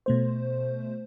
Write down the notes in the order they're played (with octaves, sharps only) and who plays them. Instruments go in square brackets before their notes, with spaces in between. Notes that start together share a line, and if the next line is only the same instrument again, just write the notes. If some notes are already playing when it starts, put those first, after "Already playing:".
[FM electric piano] B2 A3 C5